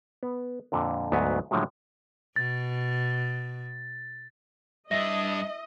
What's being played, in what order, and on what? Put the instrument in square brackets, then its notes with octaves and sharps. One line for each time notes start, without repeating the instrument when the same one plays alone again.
[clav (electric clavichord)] B3
F2 A#2 D3
D2 G#2 F#3 B3 F#4 B4
A2 D3 F3 F#3 G#3
[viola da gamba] B2 [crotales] A6
[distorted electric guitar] G2 D4 [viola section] D#5 [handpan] E5 [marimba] A#6